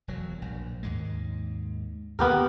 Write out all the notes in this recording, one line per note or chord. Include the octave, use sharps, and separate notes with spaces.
E1 F#3
A#1 G2
D#2 G#2 G#3
D#2 D3 A#3 B3 G4 A#4